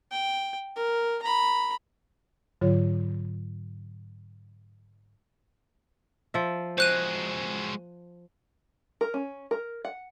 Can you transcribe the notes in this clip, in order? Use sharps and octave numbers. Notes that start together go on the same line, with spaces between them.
G5
A#4
A#5 B5
G#2 D3 F#3 F4 C#5
F3 E5
G#3 F#4 C5 F#6 D#7
A#4
C#4
A#4
F#5